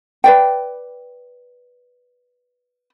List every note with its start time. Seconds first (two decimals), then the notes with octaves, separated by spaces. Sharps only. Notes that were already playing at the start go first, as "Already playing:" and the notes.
0.24 B4 D5 G5